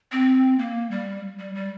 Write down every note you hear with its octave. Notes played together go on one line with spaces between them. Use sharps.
C4
A#3
G3
G3
G3